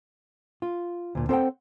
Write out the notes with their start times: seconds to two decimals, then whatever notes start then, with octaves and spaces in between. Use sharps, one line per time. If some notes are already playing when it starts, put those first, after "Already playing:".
0.62 F4
1.15 D2 A#2
1.29 C4 A4 C5 C#5 F#5 G5